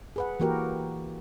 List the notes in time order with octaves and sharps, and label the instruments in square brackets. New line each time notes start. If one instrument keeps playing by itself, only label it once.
[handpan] G#4 B4 F#5
E3 A#3 F#4 G4 A#4